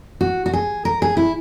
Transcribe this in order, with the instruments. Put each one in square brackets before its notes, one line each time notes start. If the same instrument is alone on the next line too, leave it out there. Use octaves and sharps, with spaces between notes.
[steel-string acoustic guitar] F#4
F#4
G#4
A#4
G#4
E4